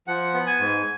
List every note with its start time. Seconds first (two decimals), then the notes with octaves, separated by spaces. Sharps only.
0.07 F3 F#5
0.34 B3
0.47 G#5
0.59 G#2